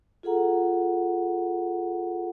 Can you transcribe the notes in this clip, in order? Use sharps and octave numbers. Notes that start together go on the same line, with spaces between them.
F4 G#4 A4 F#5 A#5